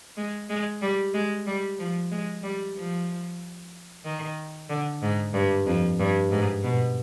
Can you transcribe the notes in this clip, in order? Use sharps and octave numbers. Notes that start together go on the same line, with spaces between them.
G#3
G#3
G3
G#3
G3
F3
G#3
G3
F3
D#3
D3
G#2
G2
F2
G2
G#2
B2